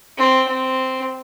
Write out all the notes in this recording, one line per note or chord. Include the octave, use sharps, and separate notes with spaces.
C4
C4